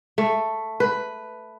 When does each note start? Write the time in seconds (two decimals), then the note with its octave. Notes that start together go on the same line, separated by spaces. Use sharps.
0.18 A3
0.80 B4